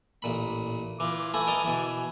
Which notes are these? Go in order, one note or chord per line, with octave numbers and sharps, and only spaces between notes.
A1 A#2 B5
E3 F4 D6
A3 B4 G#5
A#4 D#5 A5
B2 E3